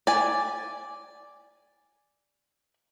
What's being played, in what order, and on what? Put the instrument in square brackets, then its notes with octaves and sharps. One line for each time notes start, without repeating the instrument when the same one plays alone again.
[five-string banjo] D5 G#5